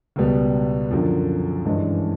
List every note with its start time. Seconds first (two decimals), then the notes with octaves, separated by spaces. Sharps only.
0.16 C#2 B2 G3 B3
0.91 F#2 D3 F3
1.65 G2 E3 G#3 C#4